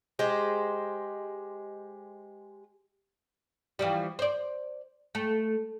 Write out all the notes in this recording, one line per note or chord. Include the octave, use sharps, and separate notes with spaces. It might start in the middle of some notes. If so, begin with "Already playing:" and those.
G#3 G4 C5
E3 F3 G3
C5 D5
A3